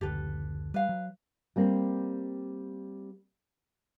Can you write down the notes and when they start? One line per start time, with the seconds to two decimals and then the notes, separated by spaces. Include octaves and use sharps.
0.01 F#1 D2 G4 A4 B4
0.74 G3 B4 F5
0.89 F#3
1.56 G3 A#3 C4